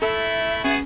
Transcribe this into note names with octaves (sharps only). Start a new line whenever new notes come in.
A3 E4 A4 E5
B3 C#4 F#4 G#4